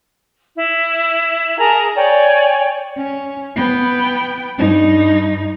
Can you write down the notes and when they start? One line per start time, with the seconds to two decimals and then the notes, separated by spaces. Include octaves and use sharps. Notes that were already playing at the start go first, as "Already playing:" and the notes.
0.57 E4
1.58 G#4 A#4 A5 A#5
1.95 C#5 D5 G5 G#5
2.97 C#4
3.56 B3 G5
4.58 G2 D#4